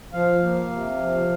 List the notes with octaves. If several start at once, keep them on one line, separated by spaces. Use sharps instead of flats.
F3 F5
A#3
C3
F3